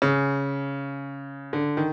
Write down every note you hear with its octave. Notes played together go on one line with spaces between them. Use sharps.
C#3
D3
D#3